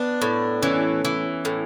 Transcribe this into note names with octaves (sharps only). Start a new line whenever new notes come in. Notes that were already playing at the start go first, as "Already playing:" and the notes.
Already playing: B3 D4
A2
E3 C#4
E3
A2